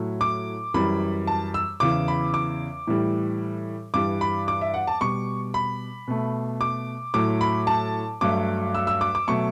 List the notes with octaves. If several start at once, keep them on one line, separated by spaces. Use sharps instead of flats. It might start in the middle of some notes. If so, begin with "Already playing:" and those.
Already playing: A2 F#3 A3
D6
F#2 E3 G3 B5
A5
E6
E2 C#3 E3 D6
B5
D6
A2 E3 G3
G2 E3 G3 D6
B5
D6
E5
F#5
A5
B2 G3 C#6
B5
B2 A3
D6
A2 F#3 A3 D6
B5
A5
G2 F#3 A3 D6
E6
E6
D6
D6
B2 F#3 A3 C#6